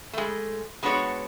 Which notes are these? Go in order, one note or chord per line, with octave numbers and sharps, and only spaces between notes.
G#3 A3
G#3 B3 D4 F#4 C#5